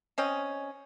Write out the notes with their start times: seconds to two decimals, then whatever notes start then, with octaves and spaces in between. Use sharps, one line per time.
0.18 C4 C#4 D#5